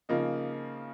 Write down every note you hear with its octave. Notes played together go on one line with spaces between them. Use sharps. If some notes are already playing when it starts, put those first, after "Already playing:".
C#3 F3 A#3 D#4